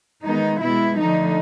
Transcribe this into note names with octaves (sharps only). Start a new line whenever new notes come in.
D#3 G#3 B3 D#4
B2 G#3 B3 E4
D3 F3 A3 D#4